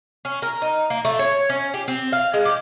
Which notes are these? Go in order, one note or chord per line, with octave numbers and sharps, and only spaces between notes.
C#4
A#4
D#4
A#3
A3
C#5
C#4
G4
C4
F5
G#3
G4